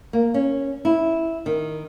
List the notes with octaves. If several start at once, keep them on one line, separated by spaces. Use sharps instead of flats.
A#3
C#4
E4
D#3